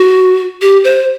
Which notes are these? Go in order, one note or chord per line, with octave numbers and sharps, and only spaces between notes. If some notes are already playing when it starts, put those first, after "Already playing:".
Already playing: F#4
G4
C5